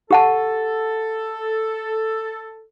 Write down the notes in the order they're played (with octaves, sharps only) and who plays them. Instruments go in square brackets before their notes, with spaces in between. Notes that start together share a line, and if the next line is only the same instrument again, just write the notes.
[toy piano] G4 F#5 A5 [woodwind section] A4